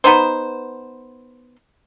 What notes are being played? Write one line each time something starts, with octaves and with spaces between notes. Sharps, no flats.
B3 D#4 C5